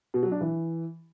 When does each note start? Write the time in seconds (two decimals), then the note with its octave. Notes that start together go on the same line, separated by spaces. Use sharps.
0.14 B2
0.23 F#3
0.32 D4
0.41 E3